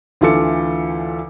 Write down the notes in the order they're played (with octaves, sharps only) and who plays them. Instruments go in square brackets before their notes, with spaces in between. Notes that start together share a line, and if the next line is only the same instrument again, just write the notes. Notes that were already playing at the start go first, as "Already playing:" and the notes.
[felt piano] D2 E3 F4 A4 D6 C#7